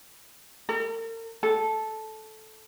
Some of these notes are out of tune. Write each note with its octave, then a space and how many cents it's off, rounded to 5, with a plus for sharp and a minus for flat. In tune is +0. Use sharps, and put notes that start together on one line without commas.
A#4 -45
A4 -10